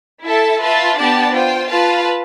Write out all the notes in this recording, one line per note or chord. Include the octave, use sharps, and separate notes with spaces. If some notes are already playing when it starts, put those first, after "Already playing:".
E4 A4 E5 A5
F4 B4 E5 A5
B3 D4 G4 D5 A5
F4 C5 G5
F4 B4 F5 A5